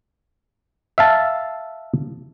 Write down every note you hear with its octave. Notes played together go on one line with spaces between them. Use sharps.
E5 F5 A5